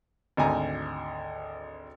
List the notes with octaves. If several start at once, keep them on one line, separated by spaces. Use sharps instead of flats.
G#1 D2 G#5 A#5